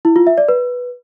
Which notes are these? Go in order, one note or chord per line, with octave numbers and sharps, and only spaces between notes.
E4
F4
E5
D5
B4